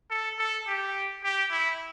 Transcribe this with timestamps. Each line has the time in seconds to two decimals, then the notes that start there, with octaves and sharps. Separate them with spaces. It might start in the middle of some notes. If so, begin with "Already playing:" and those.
0.10 A4
0.39 A4
0.68 G4
1.24 G4
1.51 E4